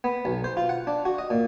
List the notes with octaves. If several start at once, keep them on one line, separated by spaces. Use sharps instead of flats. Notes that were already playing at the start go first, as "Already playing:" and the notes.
B3
B1
C5
F4
F#5
D4
F#4
D#5
A#2